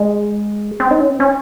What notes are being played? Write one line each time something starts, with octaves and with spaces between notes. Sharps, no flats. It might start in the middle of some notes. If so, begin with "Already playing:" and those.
Already playing: G#3
C4
D#4
C#4
C4
C#4